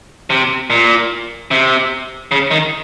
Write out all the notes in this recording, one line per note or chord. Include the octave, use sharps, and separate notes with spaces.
C3
A#2
C3
C#3
D#3